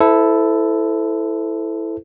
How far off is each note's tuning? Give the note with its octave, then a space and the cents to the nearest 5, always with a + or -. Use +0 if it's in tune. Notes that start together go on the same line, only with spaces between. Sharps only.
E4 +0 A4 +0 C5 -30